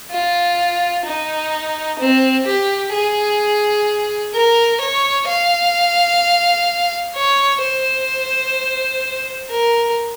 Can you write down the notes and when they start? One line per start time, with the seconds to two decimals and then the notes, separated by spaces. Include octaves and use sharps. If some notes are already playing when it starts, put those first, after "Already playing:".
0.12 F4
1.06 D#4
1.99 C4
2.46 G4
2.93 G#4
4.33 A#4
4.81 C#5
5.27 F5
7.15 C#5
7.62 C5
9.50 A#4